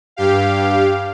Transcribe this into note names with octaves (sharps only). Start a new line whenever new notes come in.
G2 G4 F5